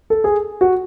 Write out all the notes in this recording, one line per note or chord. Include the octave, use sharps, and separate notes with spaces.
A4
G#4
F#4